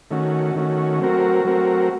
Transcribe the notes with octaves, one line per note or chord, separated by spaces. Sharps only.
D#3 A3 C#4 F#4
D#3 A3 C#4 F#4
F#3 A3 C4 F#4 A#4
F#3 A3 C4 F#4 A#4